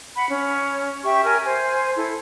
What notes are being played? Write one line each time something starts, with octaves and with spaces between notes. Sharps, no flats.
F#5 B5
C#4
G4 E5 G5 C#6
A#4 G#5 F6
C5 G#5
E4 A4